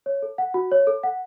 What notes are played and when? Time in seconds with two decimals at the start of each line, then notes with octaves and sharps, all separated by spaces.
0.06 C#5
0.22 A4
0.38 F#5
0.54 F#4
0.72 C#5
0.87 A4
1.04 F#5